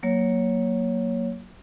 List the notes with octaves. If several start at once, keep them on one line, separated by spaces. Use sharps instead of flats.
F#3 A#3 C#5